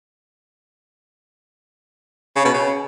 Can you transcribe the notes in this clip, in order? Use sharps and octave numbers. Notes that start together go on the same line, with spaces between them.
C#3
B2
C#3